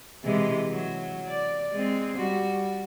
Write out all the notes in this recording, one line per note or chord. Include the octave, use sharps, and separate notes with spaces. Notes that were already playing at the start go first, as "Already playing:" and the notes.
C3 E3 G#3
F#3
D5
G#3 C4
G3 F#4